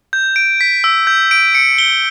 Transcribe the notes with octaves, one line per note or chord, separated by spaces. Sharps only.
G6
D7
B6
E6
G6
D7
C#7
G7